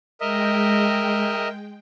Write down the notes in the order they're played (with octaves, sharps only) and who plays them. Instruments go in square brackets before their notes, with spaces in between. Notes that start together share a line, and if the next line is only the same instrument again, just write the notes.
[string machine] G#3 G5 [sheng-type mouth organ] A#4 D#5 E5